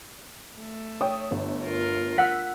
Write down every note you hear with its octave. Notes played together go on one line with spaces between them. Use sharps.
A3
C#5 G5 D#6
G1
F4 A#4
F#5 E6 B6